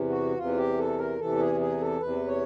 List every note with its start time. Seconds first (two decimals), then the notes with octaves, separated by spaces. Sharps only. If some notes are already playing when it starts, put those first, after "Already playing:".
Already playing: E2 C3 E3
0.10 F#4
0.37 E2 C3 E3 F4
0.58 G4
0.78 A4
0.98 A#4
1.19 E2 C3 E3 A4
1.39 G#4
1.61 G#4
1.80 A4
2.01 E2 C3 E3 B4
2.28 C#5